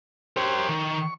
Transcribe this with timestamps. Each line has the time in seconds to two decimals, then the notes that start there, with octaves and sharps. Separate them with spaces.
0.37 G4 A#4 C5 C#5
0.69 D#3 C#6